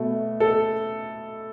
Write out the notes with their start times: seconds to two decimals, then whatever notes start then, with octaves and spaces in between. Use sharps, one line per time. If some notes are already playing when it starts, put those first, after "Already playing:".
Already playing: B2 A3
0.40 A4